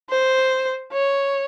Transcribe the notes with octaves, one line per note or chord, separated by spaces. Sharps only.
C5
C#5